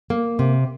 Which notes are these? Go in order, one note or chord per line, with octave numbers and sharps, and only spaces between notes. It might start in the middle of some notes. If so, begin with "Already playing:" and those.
A#3
C3